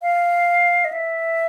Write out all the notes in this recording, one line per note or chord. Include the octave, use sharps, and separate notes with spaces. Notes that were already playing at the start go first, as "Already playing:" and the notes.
F5
D#5
E5